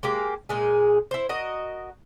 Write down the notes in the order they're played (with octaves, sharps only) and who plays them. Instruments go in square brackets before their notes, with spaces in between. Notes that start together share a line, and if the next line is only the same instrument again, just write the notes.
[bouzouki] G#3 A#3 G4
A#2 G#3 G#4
E4 C5
F#4 A#4 D#5